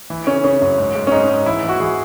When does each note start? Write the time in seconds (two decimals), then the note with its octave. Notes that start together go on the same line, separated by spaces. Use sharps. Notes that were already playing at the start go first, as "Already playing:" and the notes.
0.10 E3
0.27 C#3 C#4
0.44 C#3 C#4
0.62 F#2
0.78 G#2
0.95 G#2
1.07 C#4
1.12 G#2 D#4
1.29 G#2
1.46 E3 E4
1.63 E3
1.69 F#4
1.80 E3 G#4